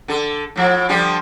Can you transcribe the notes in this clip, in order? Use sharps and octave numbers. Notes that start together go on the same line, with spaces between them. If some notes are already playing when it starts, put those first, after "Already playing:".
D3 A4
A2 F3
D3 F3 G3